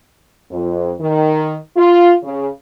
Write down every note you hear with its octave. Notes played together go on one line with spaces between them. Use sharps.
F2
D#3
F4
C#3